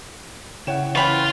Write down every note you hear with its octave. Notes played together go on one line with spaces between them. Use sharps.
C#3 E4 C#5 F#5 G5 E7
E3 C#4 F4 G5 B5 C#6